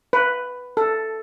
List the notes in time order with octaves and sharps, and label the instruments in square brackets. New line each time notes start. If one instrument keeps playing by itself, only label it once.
[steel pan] B4
A4